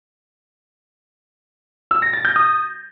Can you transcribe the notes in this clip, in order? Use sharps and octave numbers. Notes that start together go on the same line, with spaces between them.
E6
A#6
A6
G6
D#6